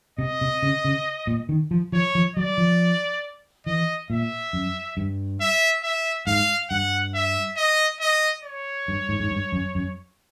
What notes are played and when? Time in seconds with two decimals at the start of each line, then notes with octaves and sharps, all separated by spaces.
0.18 C3 D#5
0.41 C3
0.63 C#3
0.85 C#3
1.27 A#2
1.49 D#3
1.71 F3
1.92 F3 C#5
2.15 F3
2.36 F#3 D5
2.58 F3
3.66 E3 D#5
4.10 A#2 E5
4.53 F#2
4.97 G2
5.41 E5
5.83 E5
6.27 G#2 F5
6.70 G2 F#5
7.15 E5
7.57 D#5
8.00 D#5
8.44 C#5
8.88 G2
9.09 G#2
9.20 G#2
9.31 G2
9.52 F#2
9.75 F#2